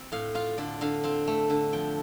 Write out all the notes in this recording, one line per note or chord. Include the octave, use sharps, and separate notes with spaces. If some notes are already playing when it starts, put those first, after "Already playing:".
Already playing: C4
A2 F5
F4 F5
D3 D5
D3 F5
C4 F5
A3
D3
F3 G5